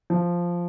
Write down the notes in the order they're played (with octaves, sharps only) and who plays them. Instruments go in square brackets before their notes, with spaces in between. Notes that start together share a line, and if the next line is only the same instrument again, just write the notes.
[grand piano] F3